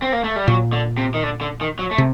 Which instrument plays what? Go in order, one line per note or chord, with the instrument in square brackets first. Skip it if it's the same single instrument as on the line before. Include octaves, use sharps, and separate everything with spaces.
[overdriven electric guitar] C4
A#3
A3
G3
[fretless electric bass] A#2 [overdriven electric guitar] F#3
[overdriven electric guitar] D3
C3
D#3
D3
D3
D#3
F#3
A3
[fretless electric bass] C3